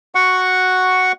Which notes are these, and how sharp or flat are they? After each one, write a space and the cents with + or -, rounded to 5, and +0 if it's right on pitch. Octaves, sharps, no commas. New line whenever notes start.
F#4 +0 F#5 +0 C#6 +0